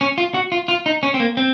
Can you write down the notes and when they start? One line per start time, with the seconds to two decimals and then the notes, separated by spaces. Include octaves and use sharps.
0.01 C#4
0.18 F4
0.34 F#4
0.52 F4
0.68 F4
0.86 D#4
1.03 C#4
1.14 C4
1.20 A#3
1.37 C4